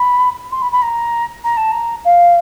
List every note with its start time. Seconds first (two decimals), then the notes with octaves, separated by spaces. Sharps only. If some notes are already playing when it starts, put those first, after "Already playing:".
Already playing: B5
0.51 C6
0.61 B5
0.72 B5
0.82 A#5
1.43 A#5
1.56 A5
1.71 A#5
2.04 F5